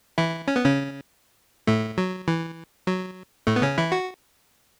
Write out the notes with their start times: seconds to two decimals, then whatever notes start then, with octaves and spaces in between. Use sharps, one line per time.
0.18 E3 E4
0.48 C#4
0.56 B3
0.65 C#3 C#4
1.67 A2 A3
1.98 F#3
2.28 E3
2.87 F#3
3.47 A2 A3
3.56 B3
3.62 C#3 C#4
3.78 E3 E4
3.92 F#4